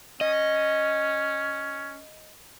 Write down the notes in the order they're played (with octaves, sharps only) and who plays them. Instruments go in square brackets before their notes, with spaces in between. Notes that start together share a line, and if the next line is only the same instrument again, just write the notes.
[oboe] C#4 [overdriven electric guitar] D#5